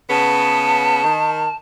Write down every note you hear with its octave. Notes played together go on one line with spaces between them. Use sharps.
C#3 B3 A5
D#3